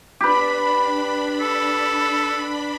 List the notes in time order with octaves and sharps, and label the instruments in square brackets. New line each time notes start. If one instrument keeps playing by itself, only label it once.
[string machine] D4 B5 [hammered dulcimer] G4 B4
[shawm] A4